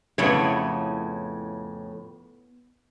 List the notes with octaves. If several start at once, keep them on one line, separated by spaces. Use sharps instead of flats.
F2 A2 C#3 B3 E4 C#5